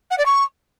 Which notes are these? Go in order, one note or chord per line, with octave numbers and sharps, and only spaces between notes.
F#5
D5
C#6